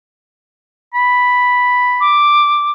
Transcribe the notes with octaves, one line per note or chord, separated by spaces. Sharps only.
B5
D6